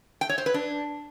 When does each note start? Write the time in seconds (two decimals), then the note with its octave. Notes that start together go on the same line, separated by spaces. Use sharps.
0.21 G5
0.29 C#5
0.38 C5
0.46 B4
0.54 D4